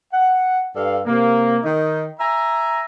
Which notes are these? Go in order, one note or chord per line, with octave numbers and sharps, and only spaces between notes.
F#5
G2 A4 D5 F5
C3 A#3
D#3 D#4
E5 G#5 A#5